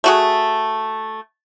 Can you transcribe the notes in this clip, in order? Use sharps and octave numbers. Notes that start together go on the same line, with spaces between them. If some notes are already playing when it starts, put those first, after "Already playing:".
A3 F#4 G#4